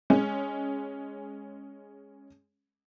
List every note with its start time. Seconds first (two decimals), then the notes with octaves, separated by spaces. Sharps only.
0.10 G#3 C#4